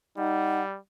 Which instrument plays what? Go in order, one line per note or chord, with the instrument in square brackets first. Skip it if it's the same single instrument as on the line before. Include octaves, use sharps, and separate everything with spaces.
[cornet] G3 [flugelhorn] D#4 [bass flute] F#5